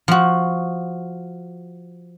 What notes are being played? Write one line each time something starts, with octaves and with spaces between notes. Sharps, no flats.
F3 F#4